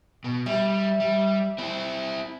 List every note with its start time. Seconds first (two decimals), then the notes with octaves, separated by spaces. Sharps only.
0.24 B2
0.46 G3 E5
1.00 G3
1.58 C4 E4